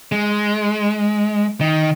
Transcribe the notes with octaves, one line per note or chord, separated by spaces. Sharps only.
G#3
D#3